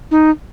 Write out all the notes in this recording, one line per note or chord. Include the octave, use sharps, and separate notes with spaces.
D#4